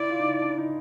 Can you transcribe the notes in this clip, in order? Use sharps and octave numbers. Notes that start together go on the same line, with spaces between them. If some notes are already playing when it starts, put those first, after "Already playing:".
Already playing: E4 D5
F4
D#4
E4
D4
D#4